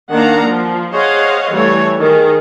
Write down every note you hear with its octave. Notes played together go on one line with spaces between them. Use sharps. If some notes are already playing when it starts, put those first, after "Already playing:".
D#3 A#3 D4 F5 F#5 A#5
F3
G#4 C5 C#5 D#5 F5 F#5
E3 G3 A3 C#5
D#3 G#4 A#4